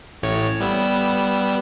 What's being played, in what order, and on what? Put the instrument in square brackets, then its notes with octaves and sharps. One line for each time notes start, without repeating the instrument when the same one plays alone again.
[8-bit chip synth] A1 A2 C#5
G3 B3 E6